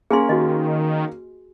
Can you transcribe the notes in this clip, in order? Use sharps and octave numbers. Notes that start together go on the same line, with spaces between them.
A#3 C#4 G#4 G#5 C6
D#3 F#4 G4 D#5